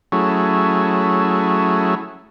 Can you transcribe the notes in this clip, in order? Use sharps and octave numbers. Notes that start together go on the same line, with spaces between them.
F#3 A3 C#4 E4 G#4